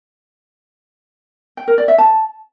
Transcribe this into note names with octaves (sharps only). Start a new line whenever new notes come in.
G5
A#4
D5
E5
A5